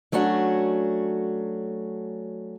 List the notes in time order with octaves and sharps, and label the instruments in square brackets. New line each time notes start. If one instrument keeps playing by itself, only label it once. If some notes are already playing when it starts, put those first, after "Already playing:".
[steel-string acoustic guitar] F#3 A3 C#4 D4 F#4